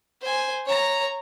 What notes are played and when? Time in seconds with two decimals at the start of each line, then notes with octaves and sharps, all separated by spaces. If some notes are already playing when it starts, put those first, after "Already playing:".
0.22 C5 G#5
0.66 C#5 A#5